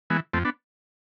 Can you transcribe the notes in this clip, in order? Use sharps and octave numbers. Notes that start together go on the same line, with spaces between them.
E3 G#3 B3
F2 A3 C4
B3 D4